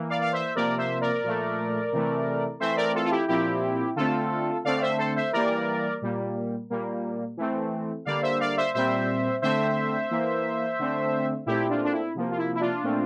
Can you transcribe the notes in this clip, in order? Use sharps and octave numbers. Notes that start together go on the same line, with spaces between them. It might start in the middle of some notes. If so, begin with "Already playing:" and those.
Already playing: E3 A#3
D5 F5
F5
C5 E5
C3 F3 A#3 A#4 D5
C5 E5
A#4 D5
A#2 F3 A3
C3 E3 A3
E3 A3 C4 C5 E5
A#4 D5
F4 A4
F4
E4 G4
A#2 F3 C4 E4 G4
D3 A3 C4 F4 A4
D3 A3 C4 D5 F5
D5
C5 E5
A4 C5
C5 E5
E3 G3 A#3 A#4 D5
A#2 G3 A#3
A#2 G3 A#3
E3 A3 C4
D3 G3 A#3 D5 F5
C5 E5
D5 F5
C5 E5
A#2 G3 C4 C5 E5
D3 A3 C4 C5 E5
E3 A#3
D3 A3 C4
A#2 A3 C4 E4 G4
D4 F4
D4
E4
C3 F3 A#3
F4
E4
E4
D4 F4
A#2 A3 C4